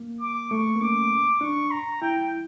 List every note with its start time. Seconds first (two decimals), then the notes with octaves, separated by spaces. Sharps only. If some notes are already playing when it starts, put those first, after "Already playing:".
Already playing: A#3
0.21 D6
0.51 A3 C#6
0.76 A#3
0.81 C#4 D6
1.41 D4 C#6
1.71 A#5
2.02 E4 G5